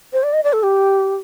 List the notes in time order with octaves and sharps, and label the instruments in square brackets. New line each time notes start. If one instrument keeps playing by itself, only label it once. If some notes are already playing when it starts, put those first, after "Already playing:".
[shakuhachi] C5
D5
D#5
D5
A4
G4